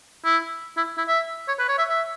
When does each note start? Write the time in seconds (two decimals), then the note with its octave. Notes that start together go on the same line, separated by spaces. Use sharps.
0.25 E4
0.77 E4
0.98 E4
1.08 E5
1.48 C#5
1.59 B4
1.69 C#5
1.78 E5
1.90 E5